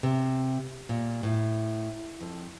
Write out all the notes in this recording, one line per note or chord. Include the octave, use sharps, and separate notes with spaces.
C3
A#2
A2
F2